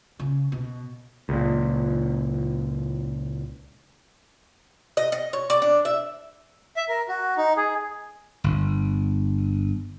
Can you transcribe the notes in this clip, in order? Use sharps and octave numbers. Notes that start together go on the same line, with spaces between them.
C#3
B2
C#2 A#2
D#5
D#5
C#5
D5
D4
E5
E5
A#4
F#4
D#4
G#4
G1